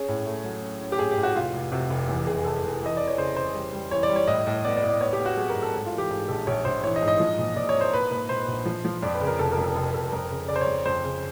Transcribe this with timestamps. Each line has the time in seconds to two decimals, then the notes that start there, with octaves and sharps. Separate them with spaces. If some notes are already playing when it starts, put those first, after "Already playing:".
Already playing: C#4 G#4
0.08 A2
0.26 A3
0.44 F#3
0.62 C#4
0.81 C#4
0.92 G4
0.99 A2 G#4
1.11 G4
1.17 A2
1.23 F#4
1.36 F1 F4
1.53 F1
1.72 C3 F#4
1.90 F1
2.09 E2
2.27 F1 G#4
2.45 F1 A4
2.64 F1
2.81 E3 D#5
2.97 E3 D5
3.07 C#5
3.18 C#3 C5
3.36 C#3 C5
3.54 G3
3.72 G3
3.91 E3 C#5
4.03 D5
4.09 G3
4.16 C#5
4.27 A2 D#5
4.47 A2
4.64 B3 D5
4.76 D5
4.83 A2
4.89 D5
5.00 B3 C#5
5.13 G4
5.19 B3
5.25 F#4
5.37 F#3 G#4
5.49 A#4
5.55 A2
5.62 A4
5.74 G#2 A4
5.86 F4
5.92 E3
5.98 G4
6.10 G#2 G#4
6.28 A#1 A4
6.47 A#1 C#5
6.65 A#1 C5
6.83 E3 C#5
6.96 D#5
7.02 G#2
7.08 D#5
7.20 F3
7.38 A#2
7.56 A#2 D5
7.69 C#5
7.74 A#3
7.81 C5
7.93 A#3 B4
8.11 A#2 B4
8.29 A#2 C5
8.48 A#1
8.66 F3
8.85 F3
9.03 F2 D5
9.15 B4
9.21 C#3
9.27 A#4
9.39 F1 A4
9.52 A#4
9.58 F2
9.64 A4
9.75 F1 A#4
9.93 F1 A4
10.12 F2 A#4
10.30 C#3
10.48 C#3 D5
10.56 C5
10.61 C#5
10.67 F2
10.85 F2 C5
11.04 C#3